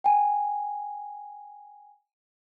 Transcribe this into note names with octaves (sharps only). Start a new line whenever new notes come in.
G5 G#5